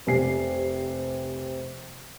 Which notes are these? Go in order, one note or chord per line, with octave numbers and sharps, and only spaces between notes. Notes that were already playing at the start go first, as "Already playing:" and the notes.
F1 C3 G#5 C7